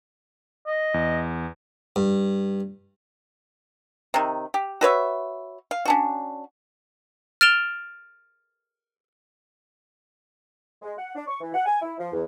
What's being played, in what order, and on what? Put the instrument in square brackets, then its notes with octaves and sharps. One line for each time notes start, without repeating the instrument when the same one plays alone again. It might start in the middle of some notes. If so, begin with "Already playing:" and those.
[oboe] D#5
[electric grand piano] E2
[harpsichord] G2
[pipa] C3 D#3
G4
F#4 B4 C#5 E5
F5
C#4 D4 F#4
[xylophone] F6 A6 D7 E7 F7 G7
[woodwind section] G#3
F#5
D4
C#6
E3
F#5
G#5
E4
F3
E2